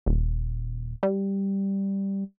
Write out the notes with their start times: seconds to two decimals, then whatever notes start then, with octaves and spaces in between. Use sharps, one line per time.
0.06 D#1
1.03 G3